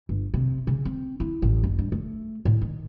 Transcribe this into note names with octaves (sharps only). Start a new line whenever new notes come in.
G1
C3
C#3
C4
E4
A1
F#1
G2
A3
A2
D#3